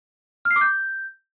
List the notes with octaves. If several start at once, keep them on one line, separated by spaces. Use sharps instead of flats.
F6
C7
D6
G6